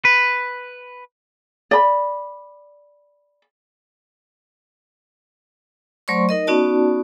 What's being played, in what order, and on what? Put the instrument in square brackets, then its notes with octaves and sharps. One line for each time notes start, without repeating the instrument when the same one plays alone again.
[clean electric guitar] B4
[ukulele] D5 B5
[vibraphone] F#3 A3 C5 D5 C6 C#6
D#4 A#4 D#5
B3 C#4 D#4 F#4 D5 A5